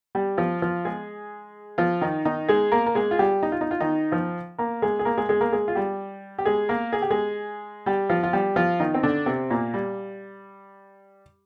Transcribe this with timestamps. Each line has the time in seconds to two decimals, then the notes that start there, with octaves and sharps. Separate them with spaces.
0.15 G3 G4
0.38 F3 F4
0.62 F3 F4
0.85 G#3 G#4
1.78 F3 F4
2.02 D#3 D#4
2.25 D#3 D#4
2.49 G#3 G#4
2.72 A#3 A#4
2.86 A#4
2.95 G#3 G#4
3.11 F4
3.19 G3 G4
3.43 D#4
3.52 F4
3.61 D#4
3.71 F4
3.80 D#3 D#4
4.12 F3 F4
4.58 A#3 A#4
4.82 G#3 G#4
4.99 G#4
5.05 A#3 A#4
5.18 G#3 G#4
5.29 G#3 G#4
5.41 A#3 A#4
5.52 G#3 G#4
5.68 F4
5.75 G3 G4
6.38 G4
6.46 G#3 G#4
6.69 A#3 A#4
6.93 G#4
7.02 G4
7.10 G#3 G#4
7.86 G3 G4
8.09 F3 F4
8.23 F4
8.33 G3 G4
8.56 F3 F4
8.80 D#3 D#4
8.94 C4
9.03 D3 D4
9.26 C3 C4
9.50 A#2 A#3
9.74 G3